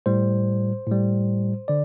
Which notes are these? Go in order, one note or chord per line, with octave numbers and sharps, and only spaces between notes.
A2 G3 C5
A2 G3
D3 D5